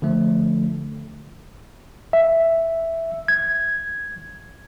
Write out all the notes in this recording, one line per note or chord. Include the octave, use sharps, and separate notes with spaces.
D3 F3 A3
E5
G#6